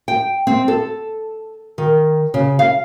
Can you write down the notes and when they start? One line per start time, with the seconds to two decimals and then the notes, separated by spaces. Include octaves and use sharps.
0.08 G5
0.47 C4
0.68 A4
1.78 D#3
2.34 C#3
2.59 F5